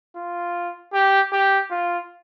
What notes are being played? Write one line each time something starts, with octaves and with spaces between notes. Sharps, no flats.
F4
G4
G4
F4